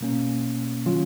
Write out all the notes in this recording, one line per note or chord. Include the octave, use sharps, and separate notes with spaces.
B2 A#3 C#4
D#3 F#3 C#4 F4